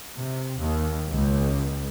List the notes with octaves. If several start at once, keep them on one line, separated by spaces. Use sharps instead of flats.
C3
D#2
C#2